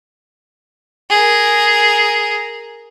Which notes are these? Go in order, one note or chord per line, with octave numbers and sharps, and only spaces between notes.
G#4 A#4